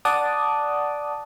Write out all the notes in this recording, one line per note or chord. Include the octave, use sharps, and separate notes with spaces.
D5 F#5 A5 D6 D#6